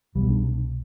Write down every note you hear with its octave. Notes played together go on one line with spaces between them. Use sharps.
C2 B2 G3
D4